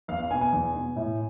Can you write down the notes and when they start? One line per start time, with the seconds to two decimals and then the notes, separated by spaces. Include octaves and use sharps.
0.08 E2 F5
0.19 F5
0.30 B2 G#5
0.41 G#5
0.53 E2
0.75 B2
0.96 A2